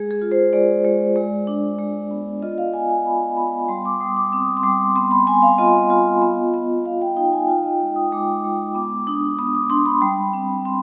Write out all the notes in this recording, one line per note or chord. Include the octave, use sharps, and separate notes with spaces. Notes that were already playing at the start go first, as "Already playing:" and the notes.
Already playing: G#3 G#4
G#4
F4
C5
G#3 D5
G#3
G#3
D4
G#3
B3
F4 D#5
F5
B3 G#5
G#5
B3 B5
B3 B5
G3 C6
D6
G3 D#6
D6
C4 D#6
C6
G3 D6
B3 C6
B5
B3 G#5
F5
F4 D#5
F4
B3
B3
B3 F5
G5
D#4 G5
G#5
F4 G5
D#5
G#3 G5
D#6
G#3 D6
G#3
B3 D6
D4 D#6
B3 D#6
D6
D4 C6
B5
G3
C4
C4 C6